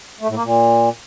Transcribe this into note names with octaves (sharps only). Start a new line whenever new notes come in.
A3
A2
A#3
A#2